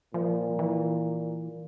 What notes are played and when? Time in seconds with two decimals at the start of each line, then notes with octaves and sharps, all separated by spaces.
0.14 A#2 F3
0.59 E3